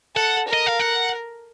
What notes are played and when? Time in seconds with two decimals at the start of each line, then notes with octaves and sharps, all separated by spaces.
0.16 A4 F#5
0.48 A#4
0.53 D#5
0.67 F5
0.80 F#5